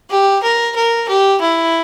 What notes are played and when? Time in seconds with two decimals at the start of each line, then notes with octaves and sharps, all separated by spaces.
0.10 G4
0.43 A#4
0.76 A#4
1.08 G4
1.41 E4